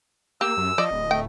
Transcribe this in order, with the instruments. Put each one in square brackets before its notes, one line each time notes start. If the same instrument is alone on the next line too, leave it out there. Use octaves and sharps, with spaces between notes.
[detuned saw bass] A#3 [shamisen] G4 [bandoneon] E6
[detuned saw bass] F#2
[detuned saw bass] F3 [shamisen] D5 [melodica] D#5
[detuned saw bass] D1
[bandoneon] A3 [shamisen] G5